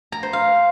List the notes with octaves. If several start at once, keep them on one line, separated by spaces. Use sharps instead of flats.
A#5
C5
F5